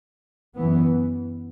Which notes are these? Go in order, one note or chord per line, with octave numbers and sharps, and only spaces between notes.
F#2 E3 B3